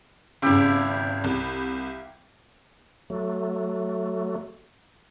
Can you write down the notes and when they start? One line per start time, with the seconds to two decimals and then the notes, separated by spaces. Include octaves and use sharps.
0.42 G#1 C#3 E4 G4 F5
1.24 C2
3.10 F#3 A3